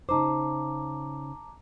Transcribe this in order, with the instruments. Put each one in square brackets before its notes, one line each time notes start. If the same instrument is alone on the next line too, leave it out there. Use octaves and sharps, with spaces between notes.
[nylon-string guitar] C#3 D#4 C5 [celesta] A5 A#5 D6